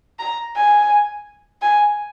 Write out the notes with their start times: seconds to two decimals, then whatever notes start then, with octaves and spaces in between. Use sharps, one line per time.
0.19 A#5
0.56 G#5
1.61 G#5